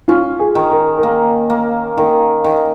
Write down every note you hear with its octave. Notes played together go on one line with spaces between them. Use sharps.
C#4 F4
G#4
D#3
A#4
A#4
A#3
A#3
D#3 A#4
D#3